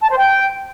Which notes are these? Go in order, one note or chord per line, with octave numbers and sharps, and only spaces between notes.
A5
C5
G5